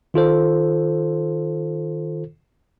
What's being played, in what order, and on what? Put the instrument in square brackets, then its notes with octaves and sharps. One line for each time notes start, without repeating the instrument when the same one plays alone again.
[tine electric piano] D#3 F4 A4 C5